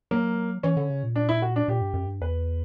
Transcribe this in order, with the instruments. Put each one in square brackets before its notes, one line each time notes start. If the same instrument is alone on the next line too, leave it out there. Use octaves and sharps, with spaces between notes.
[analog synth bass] F#3 [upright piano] A#3
[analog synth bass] E3 [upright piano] C#4
[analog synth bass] D3
C#3
A#2
[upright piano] D4
E4
F#4
D4
[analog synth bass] A#2 [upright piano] G4
[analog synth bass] G2
F#2
G2
[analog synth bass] E2 [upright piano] B4